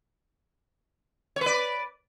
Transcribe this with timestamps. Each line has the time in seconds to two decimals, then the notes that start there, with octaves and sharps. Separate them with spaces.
1.36 C#5
1.41 B4
1.46 D5